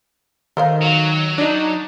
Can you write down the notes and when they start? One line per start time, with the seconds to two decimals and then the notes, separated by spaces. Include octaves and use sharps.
0.57 D#3 A4 C5 F5
0.81 F#3
1.38 D4 D#4